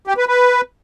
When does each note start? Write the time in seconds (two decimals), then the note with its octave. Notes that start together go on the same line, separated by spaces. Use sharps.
0.07 G4
0.18 B4
0.28 B4